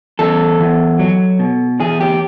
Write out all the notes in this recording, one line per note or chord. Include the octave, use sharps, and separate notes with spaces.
E2 A4
E2
F#3
B2
E2 G#4
G4